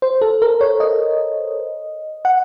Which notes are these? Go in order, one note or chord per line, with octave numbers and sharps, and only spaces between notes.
C5
A4
A#4
C#5
D#5
F#5